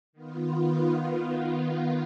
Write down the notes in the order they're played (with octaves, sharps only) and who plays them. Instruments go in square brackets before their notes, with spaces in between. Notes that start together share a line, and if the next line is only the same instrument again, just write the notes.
[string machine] D#3 B3 F4